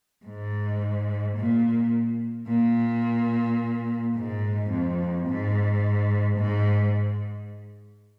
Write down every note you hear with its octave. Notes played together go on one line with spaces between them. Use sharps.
G#2
A#2
A#2
G#2
F2
G#2
G#2